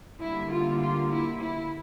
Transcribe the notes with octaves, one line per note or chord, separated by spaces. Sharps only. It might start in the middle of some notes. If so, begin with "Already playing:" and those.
D3 G3 A#3 E4
F4
F4
E4
E4